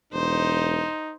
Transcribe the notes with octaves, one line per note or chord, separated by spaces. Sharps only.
E1 D#4 C5